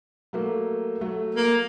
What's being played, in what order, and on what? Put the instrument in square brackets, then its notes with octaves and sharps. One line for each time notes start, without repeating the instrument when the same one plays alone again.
[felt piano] F#3 A3 A#3
F#3 A3
[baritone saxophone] A#3